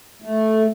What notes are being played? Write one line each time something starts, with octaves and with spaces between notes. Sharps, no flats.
A3